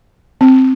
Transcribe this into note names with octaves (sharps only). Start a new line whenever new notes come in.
C4